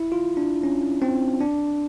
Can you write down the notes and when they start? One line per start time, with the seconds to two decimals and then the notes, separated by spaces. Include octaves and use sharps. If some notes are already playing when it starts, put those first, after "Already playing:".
Already playing: E4
0.12 F4
0.37 D4
0.63 C#4
1.02 C4
1.41 D4